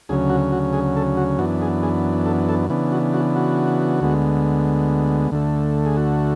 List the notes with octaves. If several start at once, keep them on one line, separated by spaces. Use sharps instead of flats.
D2 C#3 F#3 C#4 G#4
F#4
F#4
G#4
A4
F#4
F#2 E3 B3 D4 F#4
G#4
G#4
A4
A4
C#3 E3 B3 D4
F#4
F#4
F#4
D2 D3 G#3 B3
D2 D3 A3
G#4
F#4